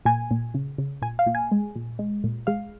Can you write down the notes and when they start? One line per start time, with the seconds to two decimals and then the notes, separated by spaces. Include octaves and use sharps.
0.05 A#2 G#5
0.31 A#2
0.54 C#3
0.78 C#3
1.02 A#2 G#5
1.19 F5
1.26 A#2
1.35 G#5
1.51 G#3
1.76 A#2
1.99 G#3
2.24 A#2
2.47 G#3 F5